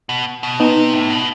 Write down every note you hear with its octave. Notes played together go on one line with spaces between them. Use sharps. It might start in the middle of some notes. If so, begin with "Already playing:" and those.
B2
B2
C3 B3 D#4
A2
B2